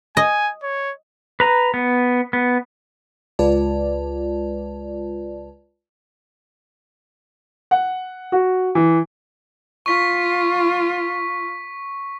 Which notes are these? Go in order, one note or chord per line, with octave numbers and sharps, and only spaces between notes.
D#5 G#5
C#5
B4 A#5
B3
B3
C#2 G#3 F4 B4 D5 A5
F#5
F#4
E3
F4 C#6 B6